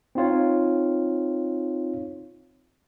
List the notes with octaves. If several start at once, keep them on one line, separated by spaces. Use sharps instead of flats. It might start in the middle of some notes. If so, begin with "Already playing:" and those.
C4 D#4 F4 C#5